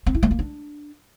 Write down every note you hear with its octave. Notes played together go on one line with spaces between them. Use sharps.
C4
E4
A3
A#3
D4